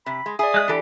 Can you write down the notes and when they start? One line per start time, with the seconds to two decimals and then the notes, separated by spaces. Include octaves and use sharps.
0.06 C3 B5
0.26 G#3
0.39 G#4 D5 E5 D#6
0.54 G#3 F#6
0.68 E3 D4 G4 A4